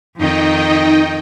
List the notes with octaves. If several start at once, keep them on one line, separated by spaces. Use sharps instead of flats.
F2 D#3 D#4 D#5 G5